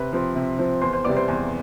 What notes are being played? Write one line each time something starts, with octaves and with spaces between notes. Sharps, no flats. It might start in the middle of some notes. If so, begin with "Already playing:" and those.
Already playing: C3 B4 B5
F3 C4
C3
F3 C4
E2 C5 C6
C5 C6
C3 G3 B3 D5 D6
C5 C6
E2